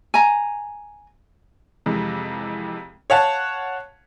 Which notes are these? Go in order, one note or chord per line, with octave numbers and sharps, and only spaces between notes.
G#5 A#5
F2 C3 E3 G#3
C#5 F5 F#5 A5